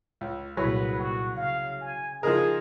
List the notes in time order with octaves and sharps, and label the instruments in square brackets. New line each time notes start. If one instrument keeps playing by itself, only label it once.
[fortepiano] C#2
[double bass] C2 A#2 [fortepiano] F#3 E4 G#4 [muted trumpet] B4
[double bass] A#2 [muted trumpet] F#4
[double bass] C#3 [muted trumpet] F5
[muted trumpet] G#5
[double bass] C#3 [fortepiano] F3 D#4 A#4 [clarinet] G#4 [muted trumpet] G#5